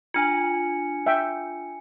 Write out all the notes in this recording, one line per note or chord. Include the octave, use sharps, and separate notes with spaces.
D4 F4 G#5 C#7
E5 G5